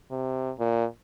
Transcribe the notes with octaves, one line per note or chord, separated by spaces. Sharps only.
C3
A#2